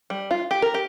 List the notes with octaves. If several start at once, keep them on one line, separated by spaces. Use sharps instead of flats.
G3
F4
G4
A#4
G4